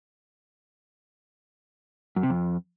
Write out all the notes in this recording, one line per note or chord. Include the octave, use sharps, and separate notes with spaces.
F#2
C3
F2